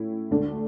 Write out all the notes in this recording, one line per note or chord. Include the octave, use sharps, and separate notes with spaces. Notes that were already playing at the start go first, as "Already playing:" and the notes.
Already playing: A2 C#4 E4
D2 D3 A3 D4